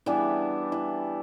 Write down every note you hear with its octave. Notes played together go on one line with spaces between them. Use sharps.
E3 G3 B3 D4 E4
E4